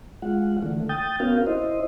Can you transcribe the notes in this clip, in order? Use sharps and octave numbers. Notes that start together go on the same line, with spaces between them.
G#3 F4 F#5
D3 E3 A3
G5 D#6 G6 A6
B3 C#4 F#4 A#4 F5
E4 C5 D#5